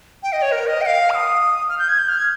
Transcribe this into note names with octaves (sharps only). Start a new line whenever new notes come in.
G5
D#5
C#5
A#4
D#5
G5
F5
F6
D#6
F6
G6
G#6
G6
F6
G#6